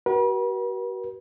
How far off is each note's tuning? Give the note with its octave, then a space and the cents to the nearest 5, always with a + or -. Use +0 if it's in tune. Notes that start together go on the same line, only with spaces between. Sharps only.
F#4 +40 B4 -45